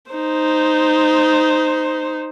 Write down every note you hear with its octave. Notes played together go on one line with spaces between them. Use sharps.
D#4 C5